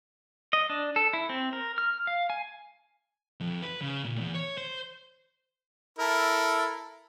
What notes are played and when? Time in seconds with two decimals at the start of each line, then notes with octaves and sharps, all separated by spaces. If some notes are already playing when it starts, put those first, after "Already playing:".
0.53 D#5
0.69 D4
0.96 A4
1.13 E4
1.29 C4
1.53 A#4
1.78 F6
2.07 F5
2.30 G#5
3.40 F2
3.62 B4
3.82 C#3
4.04 A#2
4.21 E2
4.35 C#5
4.58 C5
5.99 E4 A4 A#4